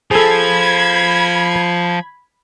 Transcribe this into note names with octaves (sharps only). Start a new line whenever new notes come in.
F3 G#4 A4 B5 G#6